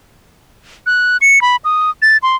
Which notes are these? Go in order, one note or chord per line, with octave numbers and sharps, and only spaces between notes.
F#6
C#7
B5
D#6
A6
C6